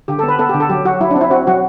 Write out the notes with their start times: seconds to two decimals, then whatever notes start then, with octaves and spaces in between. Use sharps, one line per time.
0.08 D3 G4
0.19 B3 A4
0.28 B4
0.39 B3 A4
0.49 D3 G4
0.60 A4
0.69 F#3 G4
0.85 F#3 F#4
1.01 F#3 E4
1.11 D4
1.16 C4
1.21 E4
1.31 C4 F#4
1.47 F#3 F#4